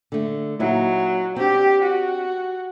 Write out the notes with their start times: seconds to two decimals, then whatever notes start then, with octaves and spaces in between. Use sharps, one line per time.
0.12 D3 A3
0.60 A#2 F#3 D#4 E4
1.36 C4 D4 G4
1.82 F#4